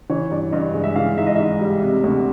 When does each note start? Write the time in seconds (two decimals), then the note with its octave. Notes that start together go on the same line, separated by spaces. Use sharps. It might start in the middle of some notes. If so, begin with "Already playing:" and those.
0.10 E3 C#5
0.31 G2 D5
0.52 G2 D#5
0.74 G#3
0.84 E5
0.96 E3 F5
1.17 G#2 E5
1.26 D#5
1.36 G#2 E5
1.61 G3
1.83 C3
2.04 D2